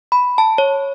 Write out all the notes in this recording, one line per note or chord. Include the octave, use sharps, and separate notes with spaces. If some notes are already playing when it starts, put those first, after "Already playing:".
B5
A5
C#5